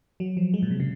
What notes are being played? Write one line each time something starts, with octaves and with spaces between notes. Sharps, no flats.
F#3
F3
G#3
A#2
C3
C#3